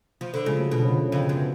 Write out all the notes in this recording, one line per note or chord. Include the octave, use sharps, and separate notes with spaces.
F3
D3
C#3 F3 G#3
F#3 A3
B2 D3 F#3
C#3 F3
C#3
F2 C#3
B2
F#2
B3